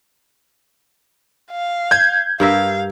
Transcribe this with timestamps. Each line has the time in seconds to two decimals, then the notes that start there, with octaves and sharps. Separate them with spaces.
1.51 F5
1.91 G6 G#6
2.40 G2 A#4 E5 F5